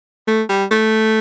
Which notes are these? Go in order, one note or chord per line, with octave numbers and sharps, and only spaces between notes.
A3
G3
A3